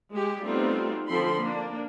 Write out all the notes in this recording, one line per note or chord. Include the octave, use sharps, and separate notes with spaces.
G#3 G4
G3 A3 B3 C4 D#4 F4
D3 F3 C4 B5 C6
A#3 D4